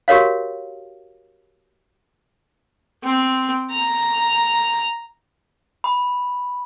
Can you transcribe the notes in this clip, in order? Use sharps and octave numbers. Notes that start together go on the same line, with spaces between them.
F#4 G4 A#4 C#5 F5
C4
A#5
B5